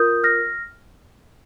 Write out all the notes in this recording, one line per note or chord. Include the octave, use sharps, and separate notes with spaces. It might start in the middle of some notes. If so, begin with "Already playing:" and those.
Already playing: F4 A#4 D#6 G6
F6 A#6